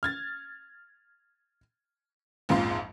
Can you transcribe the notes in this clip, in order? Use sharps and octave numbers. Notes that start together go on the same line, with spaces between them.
F6 G#6 A6
A#1 F2 G#2 F3 F5 C6